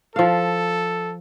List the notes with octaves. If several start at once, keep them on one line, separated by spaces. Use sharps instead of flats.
F3 A4 F5